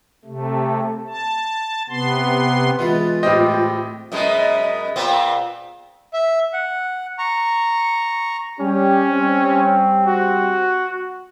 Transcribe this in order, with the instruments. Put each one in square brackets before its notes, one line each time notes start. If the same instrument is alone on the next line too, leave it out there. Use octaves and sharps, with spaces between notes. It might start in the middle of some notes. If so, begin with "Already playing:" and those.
[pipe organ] C3 A3
A5
C3 B3 C6
[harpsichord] B2 E3 G#3 [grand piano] B3 [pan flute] F4
[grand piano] A2 C4 G4 [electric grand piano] D#5
[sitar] F#2 B2 G#3
A#2 B3 C4
[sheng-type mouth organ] E5
F#5
A#5 C#6
[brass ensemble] G3 G4 [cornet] C#4
[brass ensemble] G3 C4
[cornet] F#4